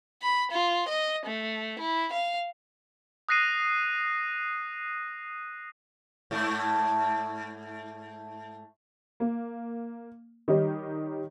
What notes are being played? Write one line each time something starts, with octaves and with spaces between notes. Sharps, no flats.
B5
F4
D#5
A3
E4
F5
D#6 F#6 A#6 C7 D#7
G#2 A3 E4
A#3
D#3 G3 D#4 G4 C#5 D#5